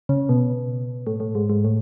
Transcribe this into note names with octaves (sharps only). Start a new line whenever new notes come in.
C#3
B2
A2
A2
G#2
G#2
A2